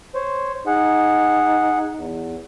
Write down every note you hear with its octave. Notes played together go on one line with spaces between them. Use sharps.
C5 C#5
D#4 G#4 F#5
E2